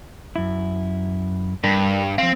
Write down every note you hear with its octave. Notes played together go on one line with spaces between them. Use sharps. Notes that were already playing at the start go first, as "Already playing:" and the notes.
F#2 E4
G2 D4 A#4
F3 C4 F5